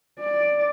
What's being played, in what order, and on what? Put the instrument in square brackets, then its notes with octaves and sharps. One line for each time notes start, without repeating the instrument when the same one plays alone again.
[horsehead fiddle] D5